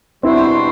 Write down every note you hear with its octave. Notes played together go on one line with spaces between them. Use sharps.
B2 G3 C4 D4 E4 F#4 C5